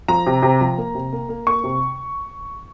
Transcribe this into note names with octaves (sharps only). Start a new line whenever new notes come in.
F3 A#5
C3
C3
F3
A#3
C3
A#3
A#3
A#3 C#6
C3